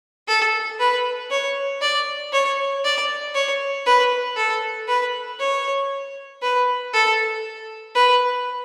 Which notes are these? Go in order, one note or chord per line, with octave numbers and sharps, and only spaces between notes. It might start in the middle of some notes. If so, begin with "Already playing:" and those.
A4
B4
C#5
D5
C#5
D5
C#5
B4
A4
B4
C#5
B4
A4
B4